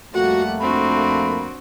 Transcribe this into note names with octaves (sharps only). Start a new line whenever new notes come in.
F2 G3 A3 A#3 F#4 F#5
C4 D4 F#4 B5